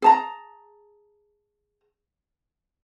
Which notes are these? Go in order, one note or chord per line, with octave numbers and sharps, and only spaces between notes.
G#4 A5 A#5